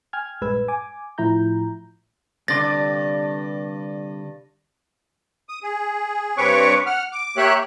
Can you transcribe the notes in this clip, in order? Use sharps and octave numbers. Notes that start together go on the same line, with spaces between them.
G5 G#5 F6 G#6
A#1 G2 G#3 B4 E6 G#6
G#5 D6
A2 F3 E4 A#5 G6
C2 G2 D3 D5 C6 A6 A#6
D#6
G#4
G2 C4 B4 C#5 C#6 D6
F#5 F6
D6
A#3 G4 C#5 E5 F#6